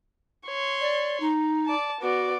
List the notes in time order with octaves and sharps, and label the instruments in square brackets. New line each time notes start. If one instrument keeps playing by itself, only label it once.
[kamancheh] C#5 C6
[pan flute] D5
D#4
[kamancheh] D5 A5
[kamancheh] B3 D5 [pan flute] F#4